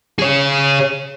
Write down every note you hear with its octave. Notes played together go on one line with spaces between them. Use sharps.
G#4 C#5